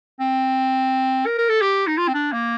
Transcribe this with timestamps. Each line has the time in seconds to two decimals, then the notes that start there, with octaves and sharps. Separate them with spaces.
0.20 C4
1.26 A#4
1.38 A#4
1.50 A4
1.62 G4
1.87 D#4
1.98 F4
2.08 C4
2.14 D4
2.33 A#3